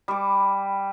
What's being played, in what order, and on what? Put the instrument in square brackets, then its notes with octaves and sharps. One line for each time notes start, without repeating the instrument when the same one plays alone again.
[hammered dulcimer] G3 D6